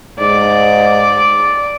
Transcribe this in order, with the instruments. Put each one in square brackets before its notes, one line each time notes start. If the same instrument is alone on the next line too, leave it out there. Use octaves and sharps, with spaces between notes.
[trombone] G#2 [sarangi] D5